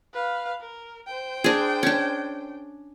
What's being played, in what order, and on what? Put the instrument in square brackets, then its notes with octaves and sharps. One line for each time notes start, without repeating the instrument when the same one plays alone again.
[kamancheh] B4 F5
A#4
C5 G5
[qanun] D4 G#4
C#4 D4